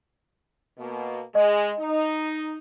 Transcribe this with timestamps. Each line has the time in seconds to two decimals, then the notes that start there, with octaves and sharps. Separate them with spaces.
0.78 B2 A#3
1.35 G#3 D#5
1.79 D#4